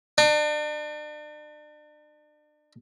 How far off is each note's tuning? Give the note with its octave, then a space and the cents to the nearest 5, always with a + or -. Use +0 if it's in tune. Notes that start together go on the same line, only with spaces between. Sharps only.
D4 +40